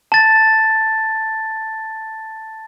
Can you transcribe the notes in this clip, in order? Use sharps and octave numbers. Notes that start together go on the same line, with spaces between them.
A5 A6